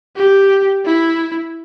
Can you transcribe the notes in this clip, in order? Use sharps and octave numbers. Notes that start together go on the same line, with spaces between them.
G4
E4